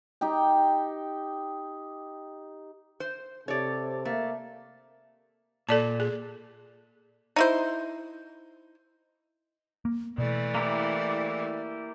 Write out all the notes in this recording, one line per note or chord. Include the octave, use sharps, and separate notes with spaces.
D#4 G4 G5
C5
C3 A4 C#5 D5
A3 A#3
A#2 A4 D5 A5
G#4
D#4 E4 C5
A#3
B2 E3 A3 D5
A#3 E4 G4